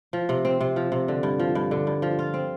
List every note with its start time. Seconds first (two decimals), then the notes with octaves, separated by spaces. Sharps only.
0.13 F3
0.29 C3
0.45 C4
0.61 C3
0.76 F3
0.92 C3
1.08 D3
1.23 G2
1.40 F3
1.55 G2
1.71 D3
1.87 G2
2.02 F3
2.19 F4
2.34 C4